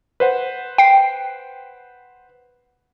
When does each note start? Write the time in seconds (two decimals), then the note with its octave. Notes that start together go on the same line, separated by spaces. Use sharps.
0.20 B4 C5 F#5
0.78 G5 C7